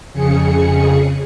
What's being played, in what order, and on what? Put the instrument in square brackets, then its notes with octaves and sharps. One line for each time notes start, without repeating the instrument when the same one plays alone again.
[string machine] F2 C#3 G#4 C#7